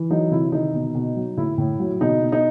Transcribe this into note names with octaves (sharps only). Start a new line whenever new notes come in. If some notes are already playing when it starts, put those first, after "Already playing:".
Already playing: E3
F#3 D#4
C3 E4
D#3 D#4
B2
B2
F#3
A2 E4
A2
F#3
B2 D#4
B2
D#4